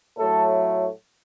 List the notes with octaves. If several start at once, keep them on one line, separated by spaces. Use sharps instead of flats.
A2 F#3 A3 A4